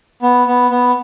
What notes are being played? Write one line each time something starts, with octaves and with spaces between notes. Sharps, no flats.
B3
B3
B3